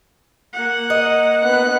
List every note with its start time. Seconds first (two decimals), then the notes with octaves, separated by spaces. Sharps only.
0.53 A#3 F#5
0.90 D#5
1.43 B3 F#6